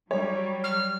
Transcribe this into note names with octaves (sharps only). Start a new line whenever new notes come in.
F#3 G3 C#5
F6